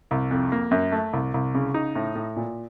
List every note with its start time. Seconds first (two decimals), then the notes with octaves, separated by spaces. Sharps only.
0.11 C2
0.31 F2
0.52 A#3
0.71 F#2
0.92 A3
1.13 C2
1.34 C2
1.54 C#3
1.74 D#4
1.95 A2
2.15 A2
2.36 A#2